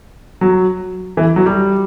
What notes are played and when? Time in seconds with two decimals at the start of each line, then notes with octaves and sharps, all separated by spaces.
0.41 F#3
1.17 E3
1.36 F#3
1.46 G3